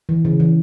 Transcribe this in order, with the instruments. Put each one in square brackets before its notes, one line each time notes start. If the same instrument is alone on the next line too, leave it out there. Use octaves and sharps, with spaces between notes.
[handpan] E3
C#3
E3